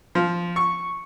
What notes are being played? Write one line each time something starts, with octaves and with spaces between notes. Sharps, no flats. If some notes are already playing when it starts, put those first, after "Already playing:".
F3
C#6